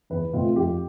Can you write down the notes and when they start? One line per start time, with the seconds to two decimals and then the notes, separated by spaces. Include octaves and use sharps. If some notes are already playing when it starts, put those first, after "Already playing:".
0.10 E2 B4
0.33 B2 A3 C4 F4
0.56 F2 G4